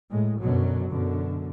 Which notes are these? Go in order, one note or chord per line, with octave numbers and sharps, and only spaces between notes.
A2 G#3
F#2 B2 D3 F#3
F#2 B2 D3